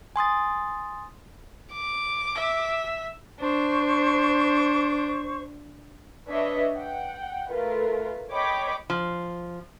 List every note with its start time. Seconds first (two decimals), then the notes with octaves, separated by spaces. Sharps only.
0.16 G#5 C6 D#6 A6
1.73 D6
2.36 E5
3.40 D4 C5 C#6
6.29 D4 B4 C#5 D#5 E5
6.74 F#5 G5
7.51 A3 F4 A#4 B4
8.32 C#5 D#5 G5 B5 D6
8.90 F3